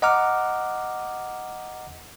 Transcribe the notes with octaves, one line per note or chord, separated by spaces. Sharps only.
D#5 F#5 A#5 D6 F6